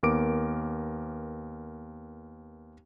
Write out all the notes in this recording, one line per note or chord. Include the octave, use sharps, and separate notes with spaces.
D#2 B3 A#4 D6 D7